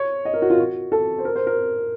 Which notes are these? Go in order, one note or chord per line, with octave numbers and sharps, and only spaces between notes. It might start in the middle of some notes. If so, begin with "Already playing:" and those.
Already playing: C#5
D#5
A#4
F#4
F4
F#4
A4
C5
A#4
C5
A#4